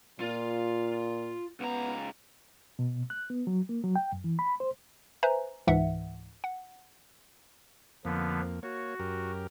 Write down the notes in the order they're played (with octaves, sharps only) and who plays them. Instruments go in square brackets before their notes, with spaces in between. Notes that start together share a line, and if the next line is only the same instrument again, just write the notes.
[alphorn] A#2 [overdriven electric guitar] F4
[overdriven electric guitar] C#2 A#5 [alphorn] B3
[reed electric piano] B2
F#6
B3
F#3
A#3
F#3
G5
F#2
E3
B5
C5
[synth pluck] B4 C5 E5 G#5 A#5
C#2 G#2 E3 E5 F#5
F#5
[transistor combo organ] F2 A#3 [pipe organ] D3 F3 B3
[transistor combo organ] A#3 C#5 [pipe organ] F#4
[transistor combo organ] F#2 G4 A#4